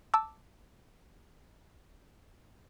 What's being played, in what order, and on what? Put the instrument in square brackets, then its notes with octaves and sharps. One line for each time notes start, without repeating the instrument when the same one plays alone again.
[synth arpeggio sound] A5 D6 E6